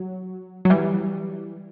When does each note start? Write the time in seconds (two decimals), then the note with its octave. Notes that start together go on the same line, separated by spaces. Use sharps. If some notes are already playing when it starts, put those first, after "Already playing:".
Already playing: F#3
0.65 F#3
0.70 E3 G3